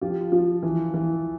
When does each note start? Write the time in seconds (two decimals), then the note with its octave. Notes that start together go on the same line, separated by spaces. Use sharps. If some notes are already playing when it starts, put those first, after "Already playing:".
0.01 F3 F4 G4
0.32 F3
0.63 E3
0.94 E3